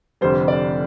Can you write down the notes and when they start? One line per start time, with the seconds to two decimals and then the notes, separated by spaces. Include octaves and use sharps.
0.21 F1 F2 D3 G3 C5
0.48 D5